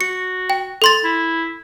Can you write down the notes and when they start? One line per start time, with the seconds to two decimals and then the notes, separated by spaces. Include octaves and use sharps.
0.01 F#4 C#7
0.50 G5
0.82 A4 C6 A6
1.04 E4